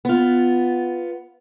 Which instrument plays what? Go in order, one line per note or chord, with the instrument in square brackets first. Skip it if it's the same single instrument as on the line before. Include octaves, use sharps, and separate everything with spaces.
[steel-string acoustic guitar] B3 F4